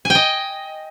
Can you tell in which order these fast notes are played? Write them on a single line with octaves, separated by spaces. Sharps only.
G#5 G5 D#5